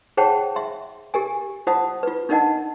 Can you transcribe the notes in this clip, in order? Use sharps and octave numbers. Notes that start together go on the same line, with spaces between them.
G#4 C5 C#5 F#5 G5 A5
E5 C6
G4 A#4 G#5
F4 C5 F#5 A5 D#6
F4 B4
D4 D#4 A#4 D#5 F#5 A5